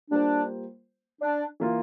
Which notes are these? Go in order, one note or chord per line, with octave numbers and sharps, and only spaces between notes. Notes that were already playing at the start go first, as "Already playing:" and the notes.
G3 A#3 D4 F4 C5
D4
E3 A#3 F4